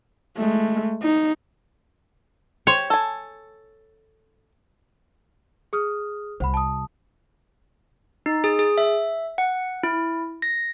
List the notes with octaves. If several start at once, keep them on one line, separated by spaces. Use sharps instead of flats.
G#3 A3
D#4
G4 C5 C#5
A4 G#5
G#4 D#6 F6
C2 C5 F#5 B5
A5 D#6
D#4
G#4
G#4
E5
F#5
E4
A#6